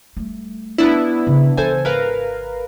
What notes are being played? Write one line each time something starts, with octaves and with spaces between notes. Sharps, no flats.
G3 A3
B3 D4 E4
C#3 F3
E3 A4 C5 G#5
G#1 A#4 B4 F5